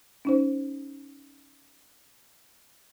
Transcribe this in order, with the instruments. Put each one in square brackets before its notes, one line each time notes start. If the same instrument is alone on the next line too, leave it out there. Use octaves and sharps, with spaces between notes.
[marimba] C#4 D#4 C5